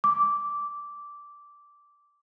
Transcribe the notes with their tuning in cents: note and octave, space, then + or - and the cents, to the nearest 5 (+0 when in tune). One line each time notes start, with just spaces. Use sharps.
D6 -10